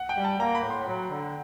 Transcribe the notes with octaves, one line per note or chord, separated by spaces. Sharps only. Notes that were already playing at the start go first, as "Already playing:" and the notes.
Already playing: F#5
G5
G3
A5
A#3 A#5
B5
A2
C6
F#3
D3